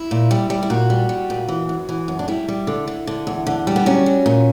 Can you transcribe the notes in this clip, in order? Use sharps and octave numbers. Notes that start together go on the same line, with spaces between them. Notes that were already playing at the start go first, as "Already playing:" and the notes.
Already playing: E4
A#2
G3
G3
E4
A#2 F#4
G3
G3
A#2
E3
F#2
E3
F#2
D4
G3 E4
G3
D3
D3
D3
E2
D3
G3
B3
F#3 C#4
F#3
A#2